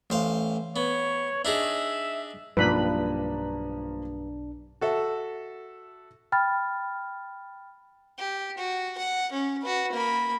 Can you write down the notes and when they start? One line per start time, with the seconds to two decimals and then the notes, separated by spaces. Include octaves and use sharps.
0.10 A1 C5 F5
0.76 B3 C#5
1.45 D4 D#4 G#4 E5
2.57 B1 G2 F3 A#3 D4 B4 B5
4.81 F#4 A4 E5
6.32 G5 B5 F6 A6
8.18 G4
8.58 F#4
8.98 F#5
9.32 C#4
9.62 F#4 B4
9.92 A#3 B5